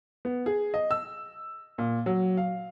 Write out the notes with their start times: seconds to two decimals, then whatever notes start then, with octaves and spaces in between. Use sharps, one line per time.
0.25 B3
0.46 G#4
0.74 D#5
0.91 E6
1.78 A#2
2.06 F#3
2.37 F5